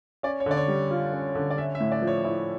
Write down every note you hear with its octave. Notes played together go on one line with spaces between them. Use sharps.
C#4 D5
C#5
D3 D5
C#5
G3
F4
C#4
D3
D5
C#4 E5
E5
A2
D5
F3
C#5
E4 D5